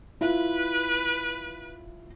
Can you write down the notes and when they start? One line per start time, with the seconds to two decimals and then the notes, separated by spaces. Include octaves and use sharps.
0.21 E4 F4 B4